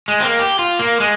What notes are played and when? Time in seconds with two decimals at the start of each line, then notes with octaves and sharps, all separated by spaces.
0.08 G#3
0.20 C4
0.24 A#3
0.39 G4
0.59 F4
0.79 A#3
1.00 G#3